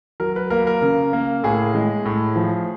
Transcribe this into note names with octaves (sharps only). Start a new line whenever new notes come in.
F#3 A#4
B4
A#3 A#4
A#4
C#3
A#3
A2 G#4
G#3
A2
F3